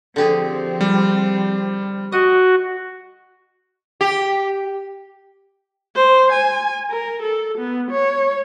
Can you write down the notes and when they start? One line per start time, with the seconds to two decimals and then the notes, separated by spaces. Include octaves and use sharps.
0.16 D3 F3 C4 G4 G#4
0.81 G3
2.12 F#4 D#5
4.01 G4
5.96 C5
6.32 G#5
6.91 A#4
7.22 A4
7.58 B3
7.91 C#5